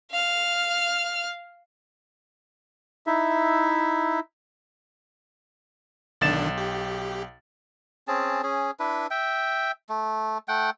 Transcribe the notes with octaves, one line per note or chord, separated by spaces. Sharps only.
F5 F6
D#4 E4 E5
B1 D3 D#3 D4 A6 E7
G4
C4 C#4 G#4 A5
C#4 G#4
D4 E4 B4
E5 G5
A3
A3 F#5 G5